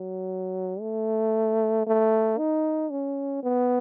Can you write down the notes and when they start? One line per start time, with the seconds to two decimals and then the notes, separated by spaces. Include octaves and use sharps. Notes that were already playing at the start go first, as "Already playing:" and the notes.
Already playing: F#3
0.81 A3
1.87 A3
2.38 D#4
2.91 C#4
3.43 B3